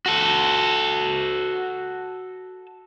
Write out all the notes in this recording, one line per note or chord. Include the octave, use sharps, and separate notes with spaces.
F#4 A4